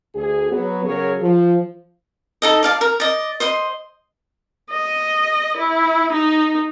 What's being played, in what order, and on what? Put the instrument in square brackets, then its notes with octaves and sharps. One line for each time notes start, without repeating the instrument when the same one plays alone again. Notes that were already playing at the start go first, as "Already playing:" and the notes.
[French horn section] D2 G#4
F#3 B3
C#3 F#3 G#4 A#4 C#5
F3
[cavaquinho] D#4 A4 D#5
D5 F5 A5
A#4
D5 D#5
C5 D#5 C6
[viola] D#5
E4
D#4